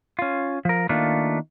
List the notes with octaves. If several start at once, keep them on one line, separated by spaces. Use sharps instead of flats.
C#4 F4
F3 A#4
D#3 A3 A#3 D4 F4